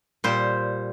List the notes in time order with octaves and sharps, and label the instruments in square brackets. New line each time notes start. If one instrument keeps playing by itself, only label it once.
[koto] A#2 G3 C5